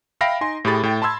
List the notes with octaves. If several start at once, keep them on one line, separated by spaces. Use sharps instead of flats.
E5 F5 G5 B5 A#6 D7
D#4 G#5 C6
A2 G4 G#4 B5 A6
A2 G5
A5 B5 C6 E6 G#6